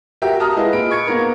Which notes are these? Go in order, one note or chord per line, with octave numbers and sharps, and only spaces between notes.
F#4 G4 A#4 E5 G5
A5 A#5 D#6 F6
G#3 E4 G#4 B4 D#5 F5
A#2 B5 D7
C#6 G#6 C#7 D7
A#3 B3 D#4 A#4